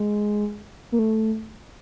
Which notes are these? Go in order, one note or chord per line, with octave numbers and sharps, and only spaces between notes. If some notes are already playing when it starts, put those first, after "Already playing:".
Already playing: G#3
A#3
A3